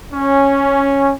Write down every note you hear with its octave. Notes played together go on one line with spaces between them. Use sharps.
C#4